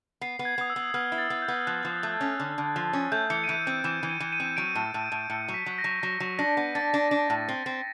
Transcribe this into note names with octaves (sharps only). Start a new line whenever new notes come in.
B3 C7
B3
G#6
B3 D#6
E6
B3
B3 F6
E4
A6
B3
G6
B3
F3 F#6
F3
A3
C#4
D3
D3
F3
C#4
A3 G6
E3 C#7
D#7
E3 D7
C4 D#7
E3 E7
E3
D#7
E3
D#7
C4
F#3 D7
A2
A2
A2
A2 C#7
F#3
B6
F#3
A#6
F#3
F#3 A#6
F#3
D4 A#6
B3
D4 A6
D4
D4
A2
C4
C4